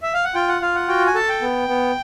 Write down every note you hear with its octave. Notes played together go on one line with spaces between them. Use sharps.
E5
F5
F#5
F4 G5
F#5
F4 F5
F#5
F#4 G5
G#5
A4 A5
G5
B3
B3